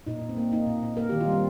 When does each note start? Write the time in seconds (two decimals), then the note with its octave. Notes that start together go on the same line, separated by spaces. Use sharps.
0.07 A#2 D#4
0.21 A#2
0.29 C4
0.37 A#3
0.52 A#3 D#4
0.67 A#2
0.83 A#2
0.97 A#3 A#4
1.09 D#3 G4
1.21 F4
1.27 G3 C4